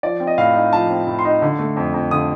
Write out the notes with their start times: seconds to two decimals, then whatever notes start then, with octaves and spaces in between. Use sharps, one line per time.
0.03 F3 D5
0.20 C4
0.27 D#5
0.38 A2 F5
0.55 D#4
0.72 F3 A5
0.90 C4
1.07 A2
1.19 C6
1.25 D#4
1.42 D3
1.59 A3
1.77 F2
1.94 F2
2.11 D3 D#6